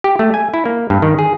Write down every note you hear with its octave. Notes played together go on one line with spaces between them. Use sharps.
G4
A3
G#5
E4
A#3
G2
D#3
G#4